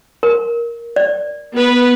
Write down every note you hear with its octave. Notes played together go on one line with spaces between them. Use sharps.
A#4
D5
B3 B4